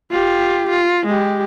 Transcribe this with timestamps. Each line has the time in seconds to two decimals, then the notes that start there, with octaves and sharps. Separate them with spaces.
0.11 F4 G4
0.69 F4
1.06 G#3 G4